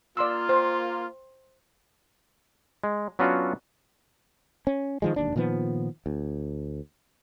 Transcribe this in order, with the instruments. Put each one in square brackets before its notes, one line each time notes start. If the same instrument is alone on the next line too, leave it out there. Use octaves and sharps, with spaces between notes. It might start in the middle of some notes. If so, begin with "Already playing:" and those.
[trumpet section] A#3 F4 [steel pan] D5 C6 E6
[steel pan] C5
[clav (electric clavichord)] G#3
F#3 B3 C#4 D4 F4 F#4
[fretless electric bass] C#4
D#3 F3 G#3
E1 D#2 D4
A#2 D#3 F3 B3
D2